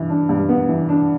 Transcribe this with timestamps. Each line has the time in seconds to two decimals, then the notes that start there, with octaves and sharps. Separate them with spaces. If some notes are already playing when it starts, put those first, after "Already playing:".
Already playing: G2 E3
0.10 D4
0.29 G2
0.49 B3
0.69 E3
0.89 D4